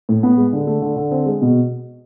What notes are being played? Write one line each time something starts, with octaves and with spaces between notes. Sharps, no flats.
A2
B3
G#3
D3
A3
D3
D3
C4
G#3
B2